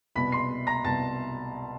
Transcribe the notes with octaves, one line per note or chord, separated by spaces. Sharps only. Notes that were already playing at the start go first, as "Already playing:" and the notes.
C2 B2 B5 B6
C6 C7
A#5 A#6
C2 B2 A5 A6